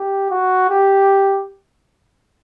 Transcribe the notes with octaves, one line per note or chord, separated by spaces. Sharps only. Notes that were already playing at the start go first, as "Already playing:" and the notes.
Already playing: G4
F#4
G4